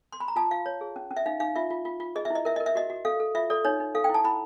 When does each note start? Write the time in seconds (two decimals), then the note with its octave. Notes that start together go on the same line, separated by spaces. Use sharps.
0.13 C6
0.20 B5
0.28 A#5
0.36 F4 A5
0.51 F4 F5
0.66 C#5
0.81 G#4
0.96 C#4
1.11 C#4
1.17 E5
1.26 D#4 F5
1.40 D#4 F5
1.56 F4 E5
1.70 F4
1.85 F4
2.00 F4
2.16 G#4 D#5
2.25 E5
2.30 E4 D#5
2.45 A#4 E5
2.56 A#4 D#5
2.66 E5
2.75 F#4 D#5
2.90 F#4
3.05 A4 F5
3.20 A4
3.35 F4 E5
3.50 A4 D5
3.65 D#4 C#5
3.80 D#4
3.95 A4 F5
4.04 G5
4.10 E4 A5
4.24 E4 B5